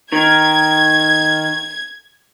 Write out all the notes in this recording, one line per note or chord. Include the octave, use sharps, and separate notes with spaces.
D#3 G#6